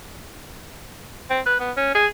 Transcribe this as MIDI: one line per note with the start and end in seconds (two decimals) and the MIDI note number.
1.30 1.40 60
1.46 1.58 71
1.59 1.71 59
1.77 1.91 61
1.95 2.06 68